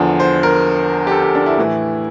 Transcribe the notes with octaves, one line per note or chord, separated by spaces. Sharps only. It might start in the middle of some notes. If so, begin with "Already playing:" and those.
Already playing: E2 D3 F3
C5
A#4
G4
A4
G4
D4
E4
A2 E3